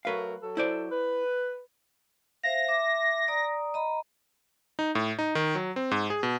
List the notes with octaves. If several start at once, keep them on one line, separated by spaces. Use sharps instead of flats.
F#3 A3 A#4 B4 F5
F#3 A4
E4 C5 D5
B4
C5 E5 F5 A#6
E5 D6
D5 A#5 D#6
D#5 A#5 B5
D#4
A2
D#4
D#3
F#3
C4
G#2
G#4
B2